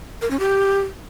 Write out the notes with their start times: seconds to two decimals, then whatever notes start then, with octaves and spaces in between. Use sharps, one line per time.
0.22 A#4
0.31 C#4
0.40 G4